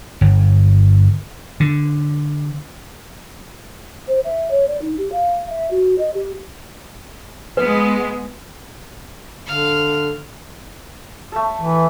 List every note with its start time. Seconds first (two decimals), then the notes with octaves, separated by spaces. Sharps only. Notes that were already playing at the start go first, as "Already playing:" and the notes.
0.21 G1
1.60 D3
4.08 C5
4.24 E5
4.51 C#5
4.67 D5
4.82 D#4
4.98 G4
5.12 F5
5.50 E5
5.71 F#4
5.98 D#5
6.14 G4
7.57 G#3 B3 B4
9.46 D3 F5
11.32 A3 A4
11.61 E3